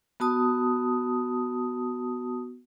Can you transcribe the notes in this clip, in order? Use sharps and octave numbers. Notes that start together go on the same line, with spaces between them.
B3 F#4 A5 D#6